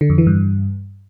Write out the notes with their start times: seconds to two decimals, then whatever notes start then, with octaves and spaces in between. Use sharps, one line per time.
0.01 D3
0.10 F2
0.18 E3
0.27 G2